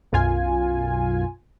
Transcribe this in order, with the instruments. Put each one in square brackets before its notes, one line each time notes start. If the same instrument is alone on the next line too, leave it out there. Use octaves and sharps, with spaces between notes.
[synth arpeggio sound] B1 F#2 F4 G#5